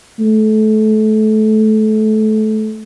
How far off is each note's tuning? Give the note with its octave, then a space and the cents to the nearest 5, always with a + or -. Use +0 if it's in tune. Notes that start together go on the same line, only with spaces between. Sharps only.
A3 -25